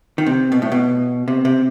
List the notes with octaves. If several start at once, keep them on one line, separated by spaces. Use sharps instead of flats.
D#3
C3
B2
A2
B2
C3
C3